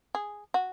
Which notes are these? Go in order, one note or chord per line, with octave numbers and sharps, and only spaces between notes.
G#4
F#4